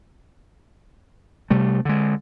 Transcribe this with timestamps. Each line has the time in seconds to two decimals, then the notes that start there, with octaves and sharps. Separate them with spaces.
1.50 C3 G3 A3
1.85 D3 G#3